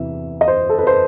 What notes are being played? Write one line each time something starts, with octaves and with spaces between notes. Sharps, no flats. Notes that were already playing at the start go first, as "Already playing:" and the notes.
Already playing: E2 C3 E3 E5
D#5
C5
A4
B4
C5